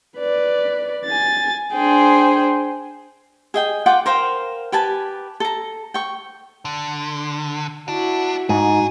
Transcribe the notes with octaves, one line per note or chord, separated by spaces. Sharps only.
B4 D5
G#5 A6
D4 G#4 C5 G5
G#4 D#5 G5
F4 F#5 G5 D6
A#4 C5 F5 G5
G4 B4 G#5 A5
A4 A#5
G5 C#6
D3
D4 E4 F#4
G#2 D#4 F#4 G#4